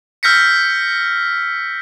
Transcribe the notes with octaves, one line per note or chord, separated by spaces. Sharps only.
E6 F6 G6 A#6 B6 C#7